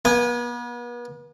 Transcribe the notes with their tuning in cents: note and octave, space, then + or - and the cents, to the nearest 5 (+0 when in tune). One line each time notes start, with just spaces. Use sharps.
B3 -40 G#5 -25